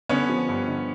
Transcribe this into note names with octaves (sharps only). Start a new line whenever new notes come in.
D3 B3 C#4
F3
G2
D3